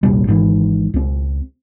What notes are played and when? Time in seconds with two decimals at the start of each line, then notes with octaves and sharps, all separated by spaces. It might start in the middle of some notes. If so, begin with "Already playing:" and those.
0.03 D#1 A#1 C3 G3
0.27 G#1 G#2 B2 E3
0.94 C#2 C4